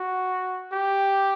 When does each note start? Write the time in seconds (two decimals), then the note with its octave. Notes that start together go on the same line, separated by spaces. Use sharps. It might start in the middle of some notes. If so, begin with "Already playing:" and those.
Already playing: F#4
0.72 G4